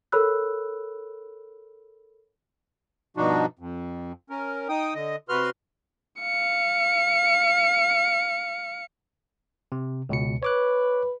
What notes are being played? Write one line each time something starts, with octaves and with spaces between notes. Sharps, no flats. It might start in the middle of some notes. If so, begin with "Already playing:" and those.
A4 A#4 C#5 B5 E6 F#6
G2 B2 F3 D4 D#4 F#4
F2
C#4 A#4
D#4 G5 D#6
D3 D#5
C3 F#4 B4 C6 F6
F5 C#7
C3
C#2 B2 C#7
B4 C#5 D6 F#6